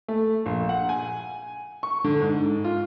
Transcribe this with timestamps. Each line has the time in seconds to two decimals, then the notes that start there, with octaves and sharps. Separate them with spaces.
0.08 A3
0.46 A#1
0.69 F#5
0.89 G#5
1.83 C#6
2.04 D3
2.21 G#2
2.64 F4